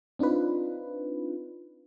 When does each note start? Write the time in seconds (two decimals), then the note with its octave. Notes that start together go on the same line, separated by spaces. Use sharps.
0.19 C4 D4 D#4 F4 B4